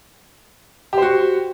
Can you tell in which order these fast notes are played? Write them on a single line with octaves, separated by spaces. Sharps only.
G4 C5 F#4